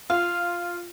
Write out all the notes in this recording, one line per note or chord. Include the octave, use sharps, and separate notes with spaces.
F4 F5